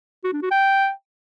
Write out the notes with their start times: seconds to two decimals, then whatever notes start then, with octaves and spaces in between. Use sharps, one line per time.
0.24 F#4
0.33 D4
0.42 F#4
0.51 G5